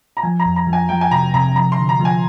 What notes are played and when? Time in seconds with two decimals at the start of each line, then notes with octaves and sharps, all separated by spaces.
0.17 A#5
0.23 F3 G#5
0.39 A#5
0.46 F2
0.56 A#5
0.67 F3
0.73 G#5
0.89 F3 G5
1.01 G#5
1.11 C3 A#5
1.34 C3 A#5
1.55 F3 A#5
1.72 C6
1.77 D3
1.89 A#5
2.00 F3
2.05 G#5